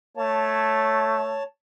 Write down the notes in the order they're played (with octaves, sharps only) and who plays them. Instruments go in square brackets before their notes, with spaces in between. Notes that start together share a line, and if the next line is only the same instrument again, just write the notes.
[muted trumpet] A3 [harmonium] C#5 A5